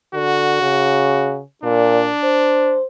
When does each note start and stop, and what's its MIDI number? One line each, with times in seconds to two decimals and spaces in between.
0.14 0.60 50
0.14 1.40 66
0.61 1.41 49
1.64 2.08 46
1.64 2.79 62
2.23 2.85 72